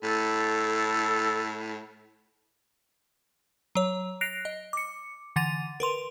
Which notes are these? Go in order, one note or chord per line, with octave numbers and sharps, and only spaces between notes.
A2 A4
F#3 C#5
F#6 A#6 C7 D7 F7
D#5
D6 C#7
D3 E3 F#5 A6 D#7 F7
A#4 B4 C6 F7